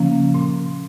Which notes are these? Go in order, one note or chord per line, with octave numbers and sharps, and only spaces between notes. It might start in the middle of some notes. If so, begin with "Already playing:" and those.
Already playing: C#3 F3 A#3 C#4
A#2 C6